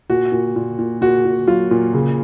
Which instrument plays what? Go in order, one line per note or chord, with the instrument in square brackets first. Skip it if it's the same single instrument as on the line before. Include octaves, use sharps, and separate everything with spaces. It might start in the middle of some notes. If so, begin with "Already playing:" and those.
[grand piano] A#2 F#4
A#2
A#2
A#2
A#2 F#4
A#2
F#3 F4
A#2
C#3